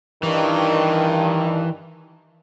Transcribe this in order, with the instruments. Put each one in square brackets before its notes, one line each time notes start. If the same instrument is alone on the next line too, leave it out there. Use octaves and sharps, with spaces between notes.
[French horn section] G2 D#3 [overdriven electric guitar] E3